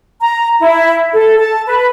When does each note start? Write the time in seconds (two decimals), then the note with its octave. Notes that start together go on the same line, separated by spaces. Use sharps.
0.21 A#5
0.60 E4
1.13 A4
1.39 A5
1.67 B4